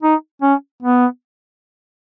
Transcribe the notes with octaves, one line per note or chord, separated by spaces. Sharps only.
D#4
C#4
B3